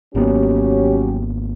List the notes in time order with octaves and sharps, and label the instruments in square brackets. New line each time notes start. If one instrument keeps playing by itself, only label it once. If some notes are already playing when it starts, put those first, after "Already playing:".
[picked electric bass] G#1 A#3 B3 [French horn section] F#3 C#4 G4